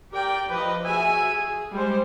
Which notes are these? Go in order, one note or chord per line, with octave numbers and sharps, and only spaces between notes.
G4 A#4 D5 G5
F3 B4 D#5
F#4 G#4 E5 G#5
G#4
G3 G#3 C5